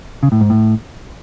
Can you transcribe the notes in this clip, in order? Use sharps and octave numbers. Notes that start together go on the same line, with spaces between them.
C#3
A2
G#2
A2